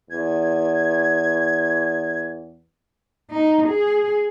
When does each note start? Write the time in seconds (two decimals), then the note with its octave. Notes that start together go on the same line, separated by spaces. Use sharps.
0.10 E2 G#6
3.31 D#4
3.69 G#4